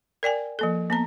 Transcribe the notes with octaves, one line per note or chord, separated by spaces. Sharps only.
A#4 D5 G5 G#5
F3 A#3 A4
A#3 B3 A#5